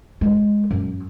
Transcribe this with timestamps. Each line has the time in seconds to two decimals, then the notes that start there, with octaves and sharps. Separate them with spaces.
0.21 G#3
0.71 F#2